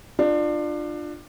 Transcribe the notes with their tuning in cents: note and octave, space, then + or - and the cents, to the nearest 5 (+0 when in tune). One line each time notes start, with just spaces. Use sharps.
D4 +25 F4 +0